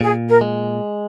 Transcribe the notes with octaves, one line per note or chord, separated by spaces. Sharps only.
A#2 G#4
A#4
G#3